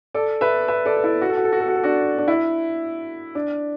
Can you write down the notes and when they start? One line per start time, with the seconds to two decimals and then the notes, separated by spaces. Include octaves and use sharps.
0.14 A4 D5
0.41 B4 E5
0.68 B4 E5
0.86 A4 D5
0.97 B4
1.04 E4 A4
1.22 F#4
1.29 A4
1.37 F#4
1.44 A4
1.52 F#4
1.60 A4
1.68 F#4
1.76 A4
1.84 D4 F#4
2.18 D4
2.28 E4
3.35 D4